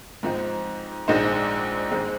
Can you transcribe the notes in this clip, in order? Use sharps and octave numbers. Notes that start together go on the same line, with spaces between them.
G#2 F3 C4 D#4
A#1 G#2 G#3 D#4 C5
G#2 G#3 C4